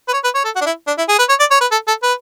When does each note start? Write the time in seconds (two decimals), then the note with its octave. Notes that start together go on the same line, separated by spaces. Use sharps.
0.08 B4
0.13 C#5
0.24 B4
0.35 C#5
0.45 A4
0.56 F#4
0.61 D4
0.66 E4
0.87 D4
0.98 E4
1.09 G#4
1.19 B4
1.29 C#5
1.40 D5
1.51 C#5
1.61 B4
1.72 A4
1.88 A4
2.03 B4